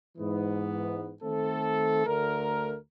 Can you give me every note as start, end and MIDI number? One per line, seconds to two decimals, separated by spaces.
0.18 1.14 44
0.18 1.14 52
0.18 1.14 59
1.22 2.02 51
1.22 2.02 57
1.22 2.02 60
1.22 2.02 69
2.06 2.77 38
2.06 2.77 50
2.06 2.77 57
2.06 2.77 70